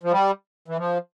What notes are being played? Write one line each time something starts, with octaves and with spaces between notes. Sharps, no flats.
F3
G3
E3
F3